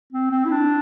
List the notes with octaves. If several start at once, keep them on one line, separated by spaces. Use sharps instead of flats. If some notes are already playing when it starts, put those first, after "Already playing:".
C4
C4
E4
D4